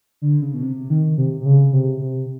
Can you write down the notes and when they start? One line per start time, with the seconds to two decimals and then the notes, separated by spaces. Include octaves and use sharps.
0.22 D3
0.42 C#3
0.54 B2
0.63 C3
0.90 D#3
1.18 C3
1.41 C3
1.46 C#3
1.73 C3
2.01 C3